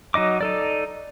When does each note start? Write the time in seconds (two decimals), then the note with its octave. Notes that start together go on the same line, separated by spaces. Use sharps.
0.14 F#3 D#4 D#5 D6
0.41 D#4 A4 D5